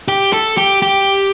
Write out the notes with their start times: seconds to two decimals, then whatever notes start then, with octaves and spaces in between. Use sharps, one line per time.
0.08 G4
0.33 A4
0.57 G4
0.82 G4